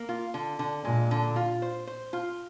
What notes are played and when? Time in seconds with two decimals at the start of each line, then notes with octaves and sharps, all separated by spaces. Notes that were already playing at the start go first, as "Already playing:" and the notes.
Already playing: A#3
0.09 F4
0.34 D3
0.59 D3
0.84 A#2 G#3
1.11 D3
1.36 F4
1.62 C5
1.87 C5
2.13 F4